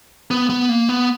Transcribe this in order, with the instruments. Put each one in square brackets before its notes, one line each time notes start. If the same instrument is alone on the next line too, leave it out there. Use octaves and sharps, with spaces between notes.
[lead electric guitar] B3
B3
A#3
B3